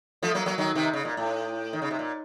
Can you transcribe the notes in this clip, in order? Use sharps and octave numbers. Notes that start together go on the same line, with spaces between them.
F3 A3
F#3 A#3
F#3 A#3
D#3 F#3
C3 D#3
C#3
A#2
A2
D#3
C#3
C3
A#2